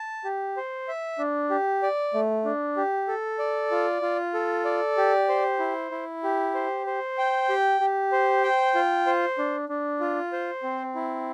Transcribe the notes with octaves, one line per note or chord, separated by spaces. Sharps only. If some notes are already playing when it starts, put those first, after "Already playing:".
Already playing: A5
G4
C5
E5
D4
G4
D5
A3
D4
G4
A4
D5
F4
F4
A4
D5
G4
C5
E4
E4
G4
C5
C5
G5
G4
G4
C5
G5
F4
C5
D4
D4
F4
C5
C4
E4